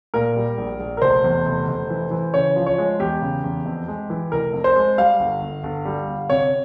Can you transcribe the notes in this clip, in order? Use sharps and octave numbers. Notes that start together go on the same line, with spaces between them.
A#2 A#4
G3
A#1
A#1
A#4
F1 C5
E2
F1
F1
E3
E3
C#3 C#5
F3
C#5
G#3
E2 G4
C#3
E2
F2
G#3
E3
F1 A#4
F2
C5
G#3
G3 F5
G1
G1
G1
G3
G1
C3 C#5